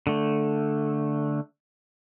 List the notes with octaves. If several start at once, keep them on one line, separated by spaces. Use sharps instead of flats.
D3 A3